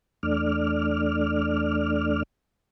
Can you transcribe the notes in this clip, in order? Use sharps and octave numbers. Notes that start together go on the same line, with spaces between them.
E2 A3 D4 D5 F6